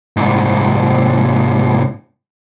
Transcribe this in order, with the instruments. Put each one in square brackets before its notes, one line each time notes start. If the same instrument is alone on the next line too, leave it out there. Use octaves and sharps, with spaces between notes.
[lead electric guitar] C2 G#2